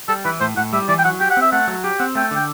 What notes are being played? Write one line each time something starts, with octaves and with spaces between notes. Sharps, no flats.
G3 A4
E3 B4
A2 C5
A2 F#5
G3 E5
E3 D5
G5
F#3 F#5
G4 G5
F#5
C4 E5
A3 F#5
F#3
G4
C4 F#5
A3 G5
D3 G5